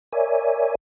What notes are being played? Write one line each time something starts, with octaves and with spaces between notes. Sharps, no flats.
A#4 C#5 D5 E5 G#5